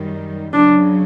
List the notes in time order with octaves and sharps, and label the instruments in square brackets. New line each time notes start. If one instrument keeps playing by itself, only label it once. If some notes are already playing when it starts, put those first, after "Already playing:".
Already playing: [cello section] F#2 D#3 G3
[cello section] F#2 C#3 F#3 [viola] D4